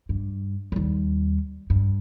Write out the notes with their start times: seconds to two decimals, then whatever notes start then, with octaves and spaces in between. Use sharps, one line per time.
0.09 G2
0.72 D#2 G3
1.70 G2